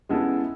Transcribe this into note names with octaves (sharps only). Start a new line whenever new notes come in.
C#3 G#3 B3 E4 A4